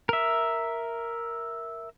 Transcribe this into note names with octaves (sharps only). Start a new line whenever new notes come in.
A#4 E5